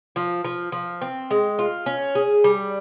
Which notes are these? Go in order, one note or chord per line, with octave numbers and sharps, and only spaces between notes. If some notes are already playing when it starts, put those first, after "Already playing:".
F3
F3
F3
C4
G#3
F4
C#4
G#4
G3